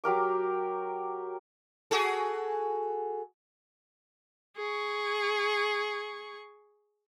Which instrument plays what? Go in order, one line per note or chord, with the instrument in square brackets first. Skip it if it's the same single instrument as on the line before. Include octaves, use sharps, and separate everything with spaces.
[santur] F#3 G4 A#4 D6
[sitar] F#4 G#4 A4
[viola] G#4 C#6